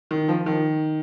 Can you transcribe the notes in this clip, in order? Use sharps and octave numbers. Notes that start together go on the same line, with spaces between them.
D#3
F3
D#3